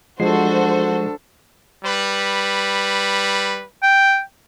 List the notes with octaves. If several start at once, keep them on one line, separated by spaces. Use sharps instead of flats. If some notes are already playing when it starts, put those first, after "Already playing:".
F3 G#3 D4 F#4 A4 C5 C7
G3 B4
G5